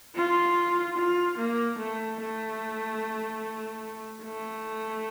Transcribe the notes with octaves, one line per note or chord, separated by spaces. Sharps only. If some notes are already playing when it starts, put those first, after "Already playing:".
F4
F4
A#3
A3
A3
A3